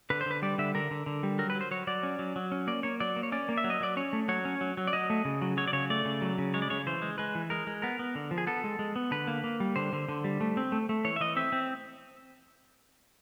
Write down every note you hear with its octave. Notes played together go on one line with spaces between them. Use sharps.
D3 B4
C5
D3 B4
G3 D5
D3 E5
D3 A#4
D3
D3
G3
F#3 A#4
B4
F#3
C5
F#3 C#5
F#3 D5
C#4
F#3
F#3
C#4
A#3 D5
A#3 C#5
F#3 D5
A#3
C#5
C#4 D5
A#3
E5
F#3
D#5
F#3 D5
C#4 C#5
A3
F#3 C#5
C#4
F#3
F#3
D5
F#3 D#5
A3
C#3
F#3
F#3 C#5
D5
C#3 C#5
A3 D5
C#3
F#3
C#3
G#3 C#5
D5
C#3 C#5
E3 C5
G#3
G#3 B4
E3
G#3 A#4
G#3
B3 A#4
B3
D3
F3
G#4
B3 A4
G#3
G#3
B3
D3 B4
A#3
A#3
G3
D3 C5
D3
D3
G3
A3
C4
A3
A3
E3 C#5
E5
E3 D#5
C4 E5
C4